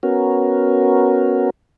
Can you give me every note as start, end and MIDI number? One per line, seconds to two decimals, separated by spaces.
0.03 1.50 59
0.03 1.50 61
0.03 1.50 66
0.03 1.50 70